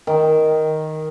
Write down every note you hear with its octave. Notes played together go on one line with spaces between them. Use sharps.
D#3